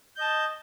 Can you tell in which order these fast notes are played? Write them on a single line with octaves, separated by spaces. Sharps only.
G6 D#5 A5